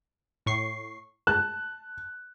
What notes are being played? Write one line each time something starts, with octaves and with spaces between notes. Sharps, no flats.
A2 C#6 C7
A5 F#6